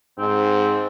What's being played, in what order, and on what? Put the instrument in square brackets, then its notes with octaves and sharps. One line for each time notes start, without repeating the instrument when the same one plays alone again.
[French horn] G#2 [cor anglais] C4